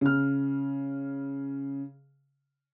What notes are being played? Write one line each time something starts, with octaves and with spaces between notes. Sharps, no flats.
C#3 F6